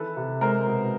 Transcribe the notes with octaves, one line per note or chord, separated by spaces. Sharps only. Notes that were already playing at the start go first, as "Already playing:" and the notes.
Already playing: D#3 E3 A4 B4
C3
G#3 A#4 C5
B2